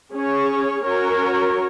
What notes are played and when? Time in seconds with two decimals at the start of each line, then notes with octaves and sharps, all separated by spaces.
0.12 C#4 G#4 C#5
0.84 C#4 F#4 A#4 C#5